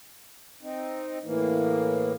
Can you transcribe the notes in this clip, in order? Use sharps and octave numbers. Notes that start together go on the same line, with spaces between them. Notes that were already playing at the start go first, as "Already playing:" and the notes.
C4 D#4
A2 E3 A#3